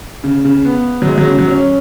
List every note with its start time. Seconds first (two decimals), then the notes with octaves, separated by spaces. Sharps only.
0.24 C#3
0.45 C#3
0.65 B3
1.02 F#3
1.07 G#3
1.18 F#3
1.27 C#3
1.39 F#3
1.48 C#4